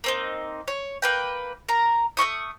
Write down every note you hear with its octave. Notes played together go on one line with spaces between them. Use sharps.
A#3 C4 D#4
C#5
A#3 B4 G5
A#4 A#5
A3 C#4 C#6 D#6